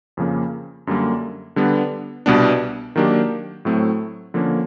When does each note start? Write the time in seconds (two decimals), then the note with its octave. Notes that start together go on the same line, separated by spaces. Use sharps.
0.17 F2 C#3 F3 A#3
0.87 F#2 D3 G3 A#3
1.56 D3 G3 B3 D4
2.26 C2 B2 G3 B3 D4
2.96 D#3 F#3 A#3 D4 G4
3.65 A2 F#3 A3 C4
4.34 D3 F3 A#3 C#4